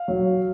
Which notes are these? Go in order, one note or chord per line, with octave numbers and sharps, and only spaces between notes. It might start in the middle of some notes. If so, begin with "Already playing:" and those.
Already playing: F5
F#3